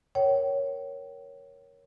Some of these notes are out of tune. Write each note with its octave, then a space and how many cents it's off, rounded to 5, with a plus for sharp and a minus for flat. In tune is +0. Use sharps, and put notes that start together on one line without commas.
A#4 +10 C#5 +0 G5 -40